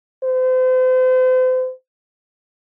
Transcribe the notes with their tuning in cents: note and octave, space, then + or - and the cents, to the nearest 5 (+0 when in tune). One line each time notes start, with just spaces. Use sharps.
C5 -40